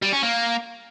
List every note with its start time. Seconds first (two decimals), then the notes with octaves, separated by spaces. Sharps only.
0.02 G3
0.12 C#4
0.23 A#3